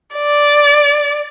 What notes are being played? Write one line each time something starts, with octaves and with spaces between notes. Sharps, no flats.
D5